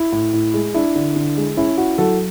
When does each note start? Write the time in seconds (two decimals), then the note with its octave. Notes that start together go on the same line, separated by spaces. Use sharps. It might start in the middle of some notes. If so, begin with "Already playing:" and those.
Already playing: E4
0.12 A2
0.33 A2
0.54 G#3
0.74 D4 E4
0.96 D3
1.16 D3
1.37 G#3
1.57 C#4 E4
1.77 E4 F#4
1.98 F#3 F#4 A4